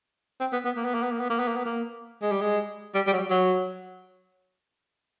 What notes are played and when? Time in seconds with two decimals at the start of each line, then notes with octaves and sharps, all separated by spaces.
0.40 C4
0.52 B3
0.65 B3
0.76 A#3
0.85 B3
0.94 A#3
1.03 B3
1.12 A#3
1.21 B3
1.30 A#3
1.39 B3
1.48 A#3
1.56 B3
1.65 A#3
2.22 G#3
2.31 G3
2.42 G#3
2.95 G3
3.07 G3
3.13 F#3
3.31 F#3